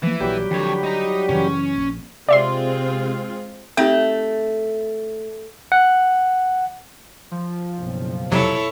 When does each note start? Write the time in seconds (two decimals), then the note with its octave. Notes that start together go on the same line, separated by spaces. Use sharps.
0.03 E3 F3 A#3
0.20 A#1 F#3 G3 G4
0.51 F2 D3 C#5
0.84 D#4 A#5
1.29 F#2 C#3 E3 C#4
1.76 A#1
2.29 C3 G#3 C4 F4 D5 E5 C6
3.77 A3 C4 D#4 G4
5.72 F#5
7.31 F3
7.78 F#1 B1
8.31 F2 C3 F#3 E4 A4 C#5